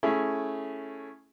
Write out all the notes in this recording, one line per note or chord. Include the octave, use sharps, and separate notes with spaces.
A3 C#4 E4 G#4